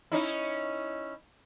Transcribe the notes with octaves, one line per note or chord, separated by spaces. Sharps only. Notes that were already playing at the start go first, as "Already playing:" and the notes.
C#4 D#4 E4